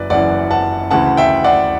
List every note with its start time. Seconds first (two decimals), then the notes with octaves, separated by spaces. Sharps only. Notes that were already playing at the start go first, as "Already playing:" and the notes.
Already playing: F#1 F#2 E3 B4 D5
0.10 F#1 F#2 E3 D5 F#5
0.51 F#5 A5
0.91 D2 C#3 E3 F#5 A5
1.17 E5 G5
1.44 D5 F#5